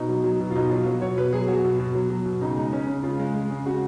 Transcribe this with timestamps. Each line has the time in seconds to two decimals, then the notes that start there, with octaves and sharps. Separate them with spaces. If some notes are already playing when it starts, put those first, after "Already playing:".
Already playing: B2 D#4
0.09 F#3
0.24 F#3
0.40 B2
0.51 F4
0.55 B2 D#4
0.70 F#3 F4
0.86 F#3 F#4
1.02 B2 C#5
1.17 B2 B4
1.33 F#3 G#4
1.48 F#3 F#4
1.64 B2
1.79 B2
1.95 F#3
2.10 F#3
2.25 B2
2.41 C#3 D#4
2.57 G#3 D#4
2.73 G#3 C#4
2.87 C#3
3.03 C#3 F4
3.19 G#3
3.34 G#3
3.50 C#3
3.66 C#3 F#4